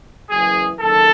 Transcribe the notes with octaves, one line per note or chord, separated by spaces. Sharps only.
F#1 F#2 E3 G#4
F#1 E2 D#3 A4